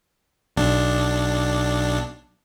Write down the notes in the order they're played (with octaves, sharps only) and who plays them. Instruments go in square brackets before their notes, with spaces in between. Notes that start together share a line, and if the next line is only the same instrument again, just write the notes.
[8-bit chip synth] B1 D4